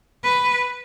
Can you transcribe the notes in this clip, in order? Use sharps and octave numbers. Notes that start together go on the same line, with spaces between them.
B4